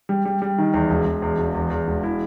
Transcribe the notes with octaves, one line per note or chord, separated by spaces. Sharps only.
G3
G3
G3
D#3
E2
E1
E1
E2
E1
E2
E2
E1
E4